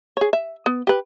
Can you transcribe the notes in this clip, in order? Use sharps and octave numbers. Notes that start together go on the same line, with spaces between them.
G#4 C#5
E5
B3
G4 B4